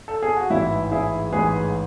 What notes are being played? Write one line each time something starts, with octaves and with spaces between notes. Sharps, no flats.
A4
G#4
F#4
A1 G#2 E3 E4
E4 G#4
A1 G#2 E3 G#4 B4